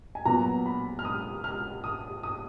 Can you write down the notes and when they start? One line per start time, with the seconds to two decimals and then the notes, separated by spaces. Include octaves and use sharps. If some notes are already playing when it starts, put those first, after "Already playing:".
0.15 G#5
0.25 A#2 F#3 B3 A#5
0.66 B5
0.99 F6
1.05 D#6
1.44 F6
1.84 D#6
2.23 D#6